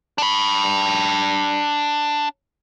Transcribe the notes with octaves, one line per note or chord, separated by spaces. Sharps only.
D4 B5